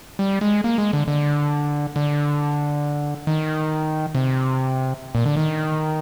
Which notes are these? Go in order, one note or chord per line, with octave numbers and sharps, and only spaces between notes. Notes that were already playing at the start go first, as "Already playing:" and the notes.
G3
G#3
A#3
G#3
D3
D3
D3
D#3
C3
A#2
D3
D#3